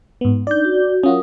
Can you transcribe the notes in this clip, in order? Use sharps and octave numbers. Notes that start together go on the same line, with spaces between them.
G#2 B3
D4 D#4 D5 G6
F#4
F#3 C#4 F4 F#4 A#4 D#6